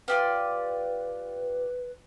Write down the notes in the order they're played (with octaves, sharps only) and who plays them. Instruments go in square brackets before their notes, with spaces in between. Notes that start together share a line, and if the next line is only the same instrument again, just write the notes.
[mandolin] F4 G4 D5 [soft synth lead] B4